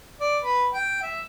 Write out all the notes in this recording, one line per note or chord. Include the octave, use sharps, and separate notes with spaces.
D5
B4
G5
E5